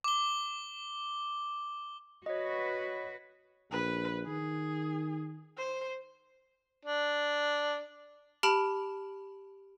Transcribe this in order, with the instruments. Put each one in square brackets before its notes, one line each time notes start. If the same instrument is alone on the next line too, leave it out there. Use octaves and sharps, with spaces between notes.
[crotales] D6 G7
[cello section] F#4 B4 [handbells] C#5 D#5
[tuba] A#1 [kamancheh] B4
[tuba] D#3 [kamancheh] G#4
[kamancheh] C5
[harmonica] D4
[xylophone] G4 A5 B5 F6 D7 F7